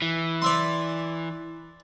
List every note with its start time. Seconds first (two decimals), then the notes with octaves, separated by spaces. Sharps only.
0.02 E3
0.42 D5 E5 C6